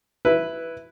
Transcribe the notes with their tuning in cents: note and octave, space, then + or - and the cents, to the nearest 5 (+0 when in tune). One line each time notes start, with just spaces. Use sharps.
E4 +0 B4 +0